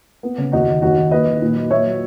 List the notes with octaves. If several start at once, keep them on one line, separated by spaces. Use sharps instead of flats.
B3
C#3
D#2 D#4 F#4
D#3
D#2 D#4 F#4
D#3
A#3 B4 D#5
D#3
A#2
F#3
A#2 C#5 E5
F#3